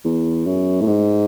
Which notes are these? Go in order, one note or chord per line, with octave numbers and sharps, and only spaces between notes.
E2
F#2
A2
G#2